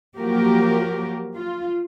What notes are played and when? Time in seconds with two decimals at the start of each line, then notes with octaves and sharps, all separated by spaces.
0.18 F3 F#3 A#3 F#4 G4 A#4
1.36 F4